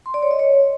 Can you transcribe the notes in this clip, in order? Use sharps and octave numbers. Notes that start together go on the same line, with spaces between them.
C6
D5
C#5
D#5
C#5